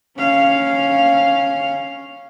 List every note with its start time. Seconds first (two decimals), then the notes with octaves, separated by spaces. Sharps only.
0.18 C#4 F5